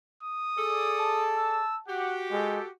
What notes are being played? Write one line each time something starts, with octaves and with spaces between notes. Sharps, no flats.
D#6
G#4 A4 D5
A5
E6
F#4 G4 F#5
G#3 A4